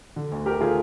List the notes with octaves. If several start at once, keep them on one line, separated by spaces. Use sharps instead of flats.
D3
D2
D2 G4 A#4
D3 F4 G#4